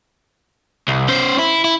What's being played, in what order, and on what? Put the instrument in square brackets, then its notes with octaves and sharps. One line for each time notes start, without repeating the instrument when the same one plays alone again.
[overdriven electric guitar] C2
C#4 C5
E4
E4